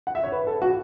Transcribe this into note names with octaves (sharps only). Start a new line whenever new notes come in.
F#5
E5
C#5
B4
A4
F#4